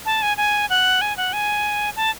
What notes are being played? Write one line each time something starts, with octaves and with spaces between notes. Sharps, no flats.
A5
G#5
G#5
F#5
G#5
F#5
G#5
A5